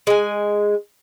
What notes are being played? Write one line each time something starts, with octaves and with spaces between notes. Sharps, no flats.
G#3 G#5